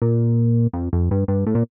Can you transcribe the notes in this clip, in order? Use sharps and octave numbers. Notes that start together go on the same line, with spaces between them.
A#2
F2
F2
G2
G2
A2
A#2